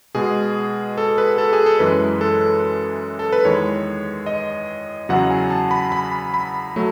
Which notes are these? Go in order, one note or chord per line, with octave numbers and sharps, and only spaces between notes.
B2 G#3 G#4
A4
B4
A4
G#4
A4
F#2 E3 G#3 B4
A4
A4
B4
E2 D#3 G#3 C#5
D#5
E2 C#3 F#3 F#5
G#5
A5
B5
B5
B5
F#3 A3